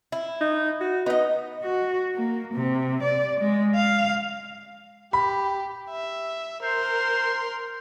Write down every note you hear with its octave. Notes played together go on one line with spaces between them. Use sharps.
E4
D#4
F#4
B3 D#4 D#5
F#4
A#3
C3
D5
G#3
F5
G4 B5
E5
A#4 C5 C6